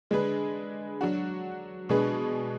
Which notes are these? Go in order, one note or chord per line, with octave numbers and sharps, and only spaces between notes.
D3 G#3 D4 G#4 B4
F#3 D4 F#4
B2 G#3 D4 G#4 B4